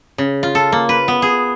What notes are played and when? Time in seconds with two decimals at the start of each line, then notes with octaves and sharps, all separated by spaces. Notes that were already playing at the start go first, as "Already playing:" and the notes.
0.18 C#3
0.43 F4
0.55 A4
0.72 A#3
0.89 B4
1.08 B3
1.22 G#4